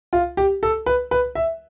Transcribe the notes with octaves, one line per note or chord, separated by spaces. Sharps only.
F4
G4
A4
B4
B4
E5